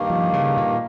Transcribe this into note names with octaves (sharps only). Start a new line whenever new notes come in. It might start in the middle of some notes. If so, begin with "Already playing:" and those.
Already playing: G2 D#3 A#3
F3
C#3
A#2